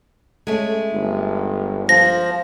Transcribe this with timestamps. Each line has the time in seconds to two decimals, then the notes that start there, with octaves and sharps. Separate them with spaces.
0.47 G#3 A3 C#4
0.92 G1
1.89 F3 A#6